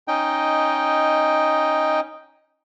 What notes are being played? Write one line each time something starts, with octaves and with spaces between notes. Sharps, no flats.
C#4 D#4 D#5 G5